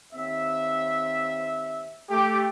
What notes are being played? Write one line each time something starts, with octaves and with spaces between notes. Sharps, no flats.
D#2 C4 E5
A3 G4